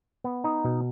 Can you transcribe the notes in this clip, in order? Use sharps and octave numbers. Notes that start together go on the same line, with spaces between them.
B3
D#4
B2